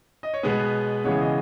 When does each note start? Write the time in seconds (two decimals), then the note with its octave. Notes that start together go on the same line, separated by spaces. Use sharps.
0.23 D#5
0.34 C#5
0.43 B2 G#3 B3 B4
1.04 C#3 E3 G#3 B3 C#5
1.21 D#5